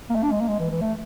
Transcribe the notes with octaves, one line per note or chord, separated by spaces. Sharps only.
A#3
A3
D4
G#3
A#3
G#3
E3
E3
A3